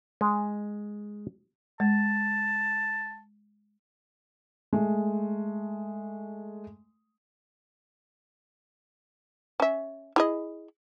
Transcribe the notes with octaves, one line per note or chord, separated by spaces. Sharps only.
G#3
G#3 A5
G#3 A3
C#4 E5
E4 G#4 D#5